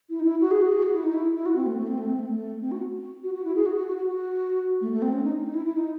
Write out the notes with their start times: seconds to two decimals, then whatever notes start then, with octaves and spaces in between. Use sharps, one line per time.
0.10 E4
0.20 D#4
0.24 E4
0.41 F#4
0.51 G#4
0.62 F#4
0.72 G#4
0.83 F#4
0.93 E4
1.04 D#4
1.14 E4
1.35 E4
1.46 F#4
1.56 C4
1.66 A3
1.77 A3
1.87 C4
1.98 A3
2.08 C4
2.19 A3
2.29 A3
2.61 C4
2.72 F#4
3.24 F#4
3.34 F#4
3.45 E4
3.56 G#4
3.66 F#4
3.76 F#4
3.87 F#4
3.97 F#4
4.08 F#4
4.81 A3
4.92 A3
5.02 C4
5.13 C#4
5.23 D#4
5.44 D#4
5.54 E4
5.65 E4
5.76 D#4